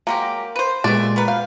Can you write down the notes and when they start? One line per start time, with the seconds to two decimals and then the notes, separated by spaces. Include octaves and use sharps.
0.07 F#3 G#3 A#3 G4
0.56 B4 C5
0.84 A#2 G#3 A3 B3 D5 D#7
1.16 B3 A#4 B4
1.28 F5 F#6 G6